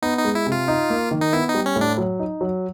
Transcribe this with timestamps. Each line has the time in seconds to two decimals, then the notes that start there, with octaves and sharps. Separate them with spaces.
0.02 B3 D#4
0.19 D#4
0.25 G#3
0.35 E4
0.46 C3
0.52 F4
0.68 D#4
0.90 A#3
1.11 D#3
1.21 D#4
1.33 B3 E4
1.49 D#4
1.55 G3
1.66 C#4
1.76 A2
1.81 D4
1.98 F#3
2.19 D#4
2.41 F#3